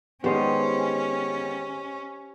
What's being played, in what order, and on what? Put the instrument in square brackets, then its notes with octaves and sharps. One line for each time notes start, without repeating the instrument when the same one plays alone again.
[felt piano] D#3 G#3 B3 [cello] C#4 [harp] G4 C5 D#5